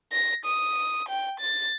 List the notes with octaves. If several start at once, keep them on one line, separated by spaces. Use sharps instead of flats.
A#6
D#6
G5
A6